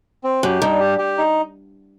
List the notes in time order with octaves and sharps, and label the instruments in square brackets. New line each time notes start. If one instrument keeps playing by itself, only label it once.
[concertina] C4
[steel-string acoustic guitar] F#2 [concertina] G4
[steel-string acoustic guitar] G2 [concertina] D#4
[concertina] G4
G4
D#4